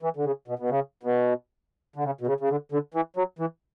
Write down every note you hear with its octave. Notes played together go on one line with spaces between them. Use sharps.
E3
D3
C#3
B2
B2
C#3
B2
D3
C#3
B2
C#3
C#3
D3
D3
E3
F#3
E3